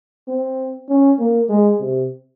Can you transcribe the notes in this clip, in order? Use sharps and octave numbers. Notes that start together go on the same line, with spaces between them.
C4
C#4
A#3
G#3
C3